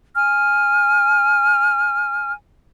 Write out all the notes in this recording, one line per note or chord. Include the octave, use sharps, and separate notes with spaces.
G#5 F6